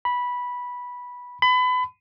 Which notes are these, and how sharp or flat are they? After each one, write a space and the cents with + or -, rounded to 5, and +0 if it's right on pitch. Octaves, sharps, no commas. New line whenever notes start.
B5 -10
B5 +30